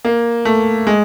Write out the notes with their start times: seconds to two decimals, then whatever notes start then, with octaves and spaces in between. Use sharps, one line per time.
0.05 A#3
0.45 A3
0.87 G#3